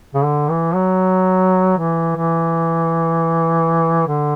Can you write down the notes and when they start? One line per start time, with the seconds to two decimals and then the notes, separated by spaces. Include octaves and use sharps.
0.15 C#3
0.24 D3
0.50 E3
0.75 F#3
1.78 E3
2.16 E3
4.07 D3